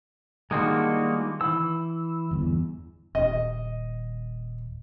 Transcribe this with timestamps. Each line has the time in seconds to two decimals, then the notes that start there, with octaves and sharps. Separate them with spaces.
0.51 D#3 G3 G#3 A#3 D4 F4 F#4
1.41 E3 E6
2.31 G1 E2
3.15 D#1 D#5